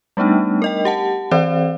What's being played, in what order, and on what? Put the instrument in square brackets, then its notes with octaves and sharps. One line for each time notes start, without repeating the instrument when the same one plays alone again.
[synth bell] G3 A3 B3 D4 D#4
A#4 D#5 G5
G4 F#5 A5
E3 C4 C5 D5 F5